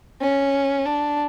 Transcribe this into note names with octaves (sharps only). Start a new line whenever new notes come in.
C#4
D4